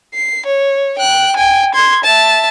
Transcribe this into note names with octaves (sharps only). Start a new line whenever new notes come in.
C7
C#5
G5 F#6
G5 G#5
C6 G#6
E5 A5